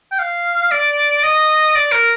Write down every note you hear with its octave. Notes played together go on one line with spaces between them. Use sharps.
G5
F5
D5
D#5
D5
A#4